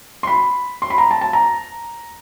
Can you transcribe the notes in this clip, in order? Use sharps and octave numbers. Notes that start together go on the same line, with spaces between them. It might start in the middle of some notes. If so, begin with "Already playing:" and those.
C6
B5
C6
B5
A#5
A5
A5
A#5